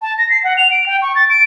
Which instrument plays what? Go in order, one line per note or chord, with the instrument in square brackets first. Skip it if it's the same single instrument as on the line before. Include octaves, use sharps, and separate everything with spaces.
[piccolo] A5
A#6
C7
F#5
F7
D7
G5
C#6
A6
D7